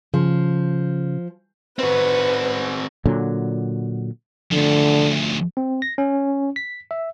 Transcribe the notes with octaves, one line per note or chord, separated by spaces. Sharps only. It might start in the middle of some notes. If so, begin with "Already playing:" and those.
C#3 F3
C4 F#4 B4
A#2 D3 F#3
D2 D3 F3
C4
A#6
C#4
B6
E5